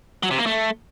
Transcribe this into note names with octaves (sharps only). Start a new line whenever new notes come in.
F#3
C3
A#3
A3